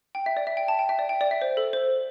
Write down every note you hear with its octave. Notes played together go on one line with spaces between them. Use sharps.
G5
E5
D5
E5
G5
A5
G5
E5
D5
G5
D5
E5
C5
A4
C5